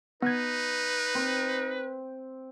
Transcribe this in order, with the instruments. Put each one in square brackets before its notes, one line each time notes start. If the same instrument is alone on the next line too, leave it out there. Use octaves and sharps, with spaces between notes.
[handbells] B3 G#6 [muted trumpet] D#4 [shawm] B4
[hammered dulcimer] C4